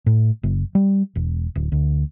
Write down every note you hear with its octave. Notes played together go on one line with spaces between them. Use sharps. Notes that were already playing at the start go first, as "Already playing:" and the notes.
A2
F#1
G3
E1
D1
D2